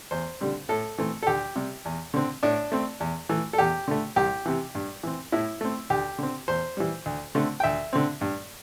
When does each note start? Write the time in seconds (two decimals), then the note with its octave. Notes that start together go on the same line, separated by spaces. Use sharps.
0.11 E2 C5
0.41 D3 G3 C4
0.69 A2 A4
0.98 E3 A3 C4
1.23 A4
1.27 D2 G4
1.55 C3 G3
1.85 E2
2.14 D3 C4
2.43 A2 D4
2.72 A3 C4
3.00 E2
3.29 E3 A3
3.53 A4
3.58 E2 G4
3.88 D3 A3
4.16 C2 G4
4.46 C3 E3
4.75 G2
5.03 E3 C4
5.32 A2 E4
5.61 A3 C4
5.90 D2 G4
6.18 D3 C4
6.48 E2 C5
6.77 E3 G3
7.06 D2
7.35 D3 A3 C4
7.60 G5
7.64 D2 E5
7.93 D3 C4
8.21 G2